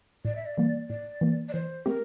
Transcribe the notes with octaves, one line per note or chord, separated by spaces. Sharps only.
A2 D5
E5
D5
E3 G3 A#3
A2 D5
E3 A#3
D5
E3 C5
A3 C4 G4 A#4